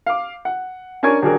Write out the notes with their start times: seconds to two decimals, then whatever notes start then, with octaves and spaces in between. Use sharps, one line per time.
0.06 F5 D6
0.45 F#5
1.03 C#4 D4 A#4 G#5 C#6 G#6
1.22 D#1 D4 F#4 G#4 A#4